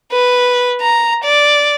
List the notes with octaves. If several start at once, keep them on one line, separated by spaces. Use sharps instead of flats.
B4
A#5
D5